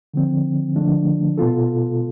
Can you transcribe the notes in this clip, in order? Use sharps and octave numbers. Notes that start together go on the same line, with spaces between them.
D3 F3 C4
D3 F3 A3 D4
B2 B3 F4 A4